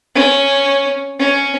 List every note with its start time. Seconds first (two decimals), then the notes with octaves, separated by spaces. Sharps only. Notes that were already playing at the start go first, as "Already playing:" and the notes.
0.15 C#4
1.19 C#4